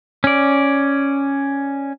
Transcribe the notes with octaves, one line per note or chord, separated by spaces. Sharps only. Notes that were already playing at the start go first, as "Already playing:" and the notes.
C#4 D5